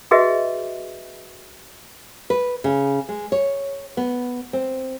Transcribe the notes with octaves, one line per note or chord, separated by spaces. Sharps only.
F#4 G#4 B4 D#5 E5
B4
C#3
G#3
C#5
B3
C4